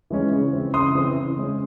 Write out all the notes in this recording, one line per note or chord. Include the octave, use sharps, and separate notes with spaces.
E3 G#3 C#4
C#3
E3 C4
C#3 C6 D#6
E3 C4
C#3
G#3 C#4